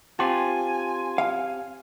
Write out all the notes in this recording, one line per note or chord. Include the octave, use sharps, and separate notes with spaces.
C4 F4 G4 G#5 A5
F5